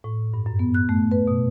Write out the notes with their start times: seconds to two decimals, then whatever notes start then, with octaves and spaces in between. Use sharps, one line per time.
0.04 A2
0.34 G2
0.46 F#2
0.59 B3
0.74 F#6
0.89 A3
1.12 B4
1.28 B2